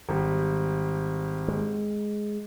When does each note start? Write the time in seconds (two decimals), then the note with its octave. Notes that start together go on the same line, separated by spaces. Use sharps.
0.09 G#1 G3
1.48 G#3